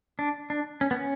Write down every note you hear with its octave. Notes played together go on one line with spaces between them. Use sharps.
D4
D4
C#4
B3
C#4